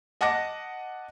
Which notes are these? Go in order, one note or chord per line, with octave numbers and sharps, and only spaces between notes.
D#5 F#5 A5 D6 A#6